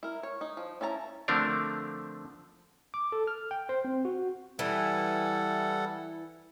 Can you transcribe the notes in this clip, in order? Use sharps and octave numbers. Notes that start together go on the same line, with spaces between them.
E4 A#4
C#5
D#4
F3
C#4 E4 A5 A#5
D3 F3 A3 C4 D4 A#4
D6
A4
F6
G5
C5
C4
F#4
E3 G3 A4 F#5